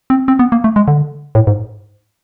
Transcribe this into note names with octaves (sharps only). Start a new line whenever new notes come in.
C4
C4
B3
A#3
A3
G#3
D3
A2
G#2